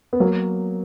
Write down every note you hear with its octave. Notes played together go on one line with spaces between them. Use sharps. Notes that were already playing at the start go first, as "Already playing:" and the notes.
B3
F#3 A#3